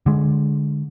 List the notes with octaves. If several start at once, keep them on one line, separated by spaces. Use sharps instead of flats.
D3 G#3